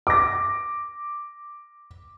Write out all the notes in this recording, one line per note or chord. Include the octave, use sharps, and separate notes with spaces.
D6 A#6